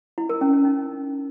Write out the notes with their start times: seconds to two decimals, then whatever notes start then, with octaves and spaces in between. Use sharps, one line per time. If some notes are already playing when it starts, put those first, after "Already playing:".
0.18 E4
0.29 A#4
0.41 C#4
0.53 C#4
0.65 D#4